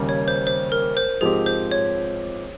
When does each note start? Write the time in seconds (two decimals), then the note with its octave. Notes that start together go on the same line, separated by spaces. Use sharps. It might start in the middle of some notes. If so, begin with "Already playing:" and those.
Already playing: D#2 C#3 G3 A#3
0.09 C#5
0.28 C5
0.47 C5
0.72 A#4
0.97 C5
1.21 G#2 F3 C4 G4 G#4
1.46 C5
1.71 C#5